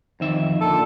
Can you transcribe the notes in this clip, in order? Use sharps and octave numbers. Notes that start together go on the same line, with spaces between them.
F2 D#3 E5
A#2 D3 A4